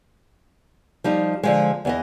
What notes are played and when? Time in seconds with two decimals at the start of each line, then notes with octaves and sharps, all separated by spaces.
1.04 F3 G3 D#4
1.43 D3 F3 G#3
1.85 E2 E3 D#5